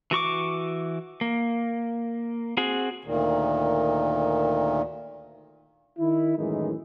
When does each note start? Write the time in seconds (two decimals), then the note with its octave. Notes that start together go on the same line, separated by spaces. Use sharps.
0.11 E3 F#4 C#6 D6
1.21 A#3
2.57 C4 F#4 G#4
3.04 D2 A#2 D#3
5.99 D#3 E4
6.37 F#2 A2 D#3 E3 G#3 D#4